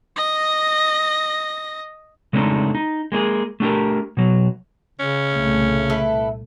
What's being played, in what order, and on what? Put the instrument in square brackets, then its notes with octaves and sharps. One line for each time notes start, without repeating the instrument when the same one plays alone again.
[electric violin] D#5 A#6
[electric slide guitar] C#3 G#3 A3 C4 D4 D#4
D#4
G#3 A#3 D#4 G#4
A3 D4 G4 A#4
B2 F#3
[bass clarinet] C#3 [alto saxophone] C#4
[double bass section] C2 A#2 A3
[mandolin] E4 A4 B4